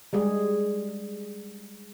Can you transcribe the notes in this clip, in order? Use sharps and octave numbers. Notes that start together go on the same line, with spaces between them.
G3 G#3 G#4